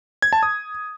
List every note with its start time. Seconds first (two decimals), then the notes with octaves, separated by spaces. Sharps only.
0.22 G#6
0.33 A5
0.43 D#6